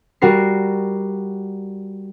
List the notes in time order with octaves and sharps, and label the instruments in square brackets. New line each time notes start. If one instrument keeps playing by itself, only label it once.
[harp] G3 F#4 A#4 C7